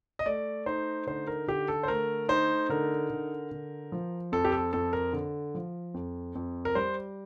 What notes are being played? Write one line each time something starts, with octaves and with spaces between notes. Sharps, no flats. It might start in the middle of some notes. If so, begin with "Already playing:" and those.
D#5
A3 D5
D#4 C5
D3 C5
A#4
D3 G4
A4
C5
A3 A#4
D#4 C5
D3 A#4
D3
D3
F3
F2 A4
G4
A4
F2 A4
A#4
D3
F3
F2
F2
A#4
G3 C5